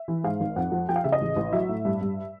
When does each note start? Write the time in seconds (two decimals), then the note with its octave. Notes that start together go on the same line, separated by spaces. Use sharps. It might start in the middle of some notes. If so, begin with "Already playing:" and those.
Already playing: E5
0.08 E3
0.24 G#2 F5
0.40 G#1
0.56 F2 F#5
0.72 F3
0.89 F3 G5
0.96 F5
1.04 C#3 E5
1.12 D#5
1.21 A1
1.36 A1
1.53 F#3 E5
1.69 A2
1.85 G2
2.01 G2